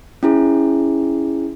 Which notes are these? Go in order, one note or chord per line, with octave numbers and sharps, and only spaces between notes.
C#4 E4 G#4